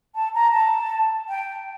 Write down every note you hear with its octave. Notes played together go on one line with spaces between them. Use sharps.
A5
A#5
A5
G5